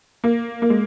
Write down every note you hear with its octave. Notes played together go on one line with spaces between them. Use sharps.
A#3
A#3
G#3